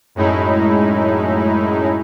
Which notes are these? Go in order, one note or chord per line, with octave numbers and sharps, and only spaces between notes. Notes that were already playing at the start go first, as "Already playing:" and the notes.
F#2 A2 G#3 D#4 E4